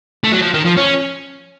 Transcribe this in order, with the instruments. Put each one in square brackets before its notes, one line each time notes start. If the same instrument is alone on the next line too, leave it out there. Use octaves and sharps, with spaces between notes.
[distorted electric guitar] A3
F#3
F3
D#3
F3
C#4